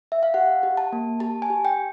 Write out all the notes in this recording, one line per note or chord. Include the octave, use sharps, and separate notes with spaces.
E5
F5
G4 F#5
G4
A5
A#3
G4 A5
G#5
G4
G5